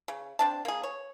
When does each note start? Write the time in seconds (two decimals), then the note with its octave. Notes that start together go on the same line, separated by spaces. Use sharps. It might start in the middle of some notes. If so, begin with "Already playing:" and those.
0.08 C#3
0.39 C4 D4 A5
0.65 A#3 G#4
0.83 C#5